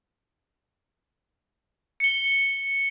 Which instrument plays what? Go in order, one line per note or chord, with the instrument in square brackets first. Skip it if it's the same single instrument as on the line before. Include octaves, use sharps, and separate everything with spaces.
[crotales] C#7 G7